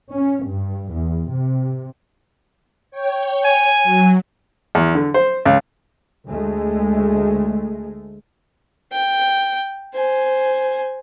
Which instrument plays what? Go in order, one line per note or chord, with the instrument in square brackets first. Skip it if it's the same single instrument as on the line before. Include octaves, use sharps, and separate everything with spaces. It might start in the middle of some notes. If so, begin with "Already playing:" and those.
[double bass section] C#4
G2
E2
C3
[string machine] C#5 G5
[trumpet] G#5
[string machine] F#3
[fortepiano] E2
D3
C5
C#2
[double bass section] D2 G#3 A3
[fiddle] G5
C5 G#5